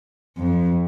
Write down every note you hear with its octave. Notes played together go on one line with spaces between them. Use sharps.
F2